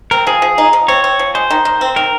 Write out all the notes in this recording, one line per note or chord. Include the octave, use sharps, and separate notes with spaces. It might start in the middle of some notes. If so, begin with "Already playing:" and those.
C4 A#4
F3 G#4
F3
D#4
F3
C4 C#5
C4
F3
G#3 C5
D#3
D#3
C4
D#3 A#4